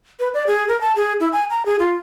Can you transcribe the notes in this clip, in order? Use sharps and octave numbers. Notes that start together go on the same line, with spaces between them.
B4
D5
G#4
A#4
A5
G#4
E4
G#5
A#5
G#4
F4